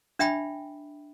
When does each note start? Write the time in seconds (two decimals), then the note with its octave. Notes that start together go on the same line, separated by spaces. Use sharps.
0.19 D4 E5 G5 B5